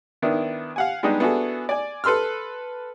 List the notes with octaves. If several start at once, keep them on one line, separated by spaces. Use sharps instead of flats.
D#3 B3 D4 E4
F5 F#5 G#5
G3 G#3 B3 D4 D#4 G4
B3 D4 E4 F#4 G#4 A4
D5 G#5
A4 B4 C6 E6 F6